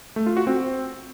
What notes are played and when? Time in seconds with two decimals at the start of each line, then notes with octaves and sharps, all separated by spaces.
0.16 A3
0.26 F4
0.37 F#4
0.47 C4